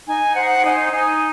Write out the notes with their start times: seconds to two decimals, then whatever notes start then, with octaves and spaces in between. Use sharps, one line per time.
0.07 D#4 G#5
0.35 C5 F#5
0.58 G5
0.64 D#4 G#5
0.92 D#4 G#5